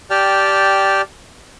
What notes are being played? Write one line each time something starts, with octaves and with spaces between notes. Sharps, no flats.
G4 D5 G5 A5 F6